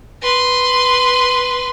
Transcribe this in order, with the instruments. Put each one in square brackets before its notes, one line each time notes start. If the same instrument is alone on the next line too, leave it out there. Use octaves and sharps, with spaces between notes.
[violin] B4 C6